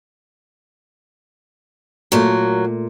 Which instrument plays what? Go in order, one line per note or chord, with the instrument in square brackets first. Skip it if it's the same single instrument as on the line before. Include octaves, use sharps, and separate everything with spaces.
[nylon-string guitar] A#2 A3 [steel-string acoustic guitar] F#3 A#3